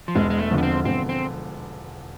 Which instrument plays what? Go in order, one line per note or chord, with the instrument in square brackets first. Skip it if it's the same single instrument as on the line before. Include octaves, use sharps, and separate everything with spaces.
[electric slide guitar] F3
[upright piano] E1 [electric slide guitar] G#3
[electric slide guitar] G#3
A3
[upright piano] E2 D3 F3
[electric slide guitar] B3
C4
[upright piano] E1 [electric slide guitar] C4
[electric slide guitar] C4